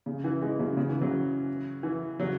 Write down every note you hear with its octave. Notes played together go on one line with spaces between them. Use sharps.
C#3
E3
E3 G#3
C#3 F#3
C#3
E3
C#3 F#3
E3
C#3 F#3